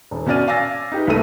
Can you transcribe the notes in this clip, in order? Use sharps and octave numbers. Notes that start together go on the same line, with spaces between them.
D#1
B2 C#4 F#4 D5 F6 D#7
F5 G#5 D6 E6 A6 A#6
D#4 G4 B4
C2 A#2 A3 A4 E5 D#7